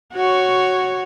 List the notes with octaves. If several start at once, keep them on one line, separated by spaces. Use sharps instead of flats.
F#4 C#5